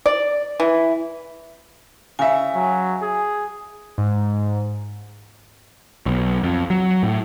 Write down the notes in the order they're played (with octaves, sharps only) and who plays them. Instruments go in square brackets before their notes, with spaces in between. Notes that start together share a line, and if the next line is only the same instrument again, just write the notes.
[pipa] D5
E3
[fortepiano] C#3 E5 [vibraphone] G#5
[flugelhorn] F#3
G#4
[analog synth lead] G#2
[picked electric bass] B1
F2
F#3
A2